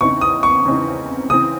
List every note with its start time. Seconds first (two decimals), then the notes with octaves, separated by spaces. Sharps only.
0.01 E2 C#3 E3 C4 D#4 C#6
0.21 D#6
0.43 C#6
0.65 E2 C#3 E3 C4 D#4
1.30 C#3 E3 C4 D#6